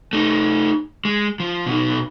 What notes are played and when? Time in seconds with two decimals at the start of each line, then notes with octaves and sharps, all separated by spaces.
0.13 A3 D#4
1.05 G#3
1.40 F3
1.66 B2 D#4